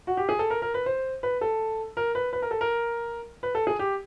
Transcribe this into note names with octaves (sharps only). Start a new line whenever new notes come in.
F#4
G4
G#4
A4
A#4
A#4
B4
C5
B4
A4
A#4
B4
B4
A#4
A4
A#4
B4
A4
G#4
G4